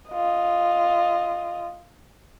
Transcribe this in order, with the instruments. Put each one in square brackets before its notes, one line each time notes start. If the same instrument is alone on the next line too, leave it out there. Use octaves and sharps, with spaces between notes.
[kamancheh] F4 D#5